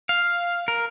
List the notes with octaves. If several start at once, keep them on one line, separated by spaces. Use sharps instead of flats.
F5
A#4